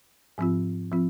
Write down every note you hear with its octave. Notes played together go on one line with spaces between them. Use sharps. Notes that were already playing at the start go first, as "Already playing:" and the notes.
G#2 F3 C4 F4
F3 C4 F4